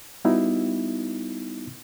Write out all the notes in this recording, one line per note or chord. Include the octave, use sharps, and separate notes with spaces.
G3 B3 D#4 E4 F#4